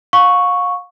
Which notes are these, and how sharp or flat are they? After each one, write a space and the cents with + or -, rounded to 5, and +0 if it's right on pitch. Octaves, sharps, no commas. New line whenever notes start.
F5 +35 C#6 +0